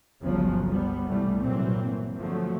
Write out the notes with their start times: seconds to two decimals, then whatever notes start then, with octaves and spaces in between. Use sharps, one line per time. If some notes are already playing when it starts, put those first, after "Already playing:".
0.21 G1 C#2 C#3 F3 F#3
0.70 G3 B3
1.09 C2 E3 G3 A3
1.40 G#1 G2 A#2 E3 F#3 C4
2.18 D3 F3 F#3 A3